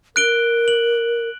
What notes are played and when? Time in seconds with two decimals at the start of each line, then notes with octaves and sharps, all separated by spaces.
0.16 A#4 F#6 D7 G7
0.68 F#7